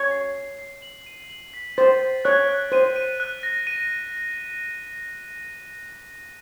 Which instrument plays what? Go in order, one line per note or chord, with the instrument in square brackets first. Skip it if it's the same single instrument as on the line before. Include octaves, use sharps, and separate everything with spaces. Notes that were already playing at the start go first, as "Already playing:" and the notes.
Already playing: [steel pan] C#5
[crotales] C7
C7
C7
F#7
D#7
F#7
B6
[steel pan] C5 [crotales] A6
[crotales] A6
[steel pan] C#5 [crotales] F#6
[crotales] F#6
[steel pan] C5 [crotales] D#7
[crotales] D#7
F#6
A#6
D#7